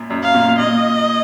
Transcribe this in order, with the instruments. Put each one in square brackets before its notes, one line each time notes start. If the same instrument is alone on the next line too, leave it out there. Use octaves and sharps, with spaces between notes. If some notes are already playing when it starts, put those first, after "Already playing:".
Already playing: [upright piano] F#2 A#2
F#2
[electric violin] F5
[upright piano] A#2
[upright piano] A#2 [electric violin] D#5